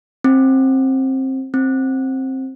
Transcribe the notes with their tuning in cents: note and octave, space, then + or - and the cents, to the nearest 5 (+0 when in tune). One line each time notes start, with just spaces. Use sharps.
C4 +20
C4 +15